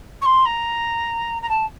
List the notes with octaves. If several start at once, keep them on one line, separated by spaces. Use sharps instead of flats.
C#6
C6
A#5
A#5
A5